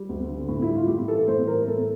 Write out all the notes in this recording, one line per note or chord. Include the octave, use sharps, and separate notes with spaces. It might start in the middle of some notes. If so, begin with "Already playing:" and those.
Already playing: G3
D2
D3
A2
E4
G3
F4
A2 G4
E3 A4
A2 C5
G3 A#4
A2 A4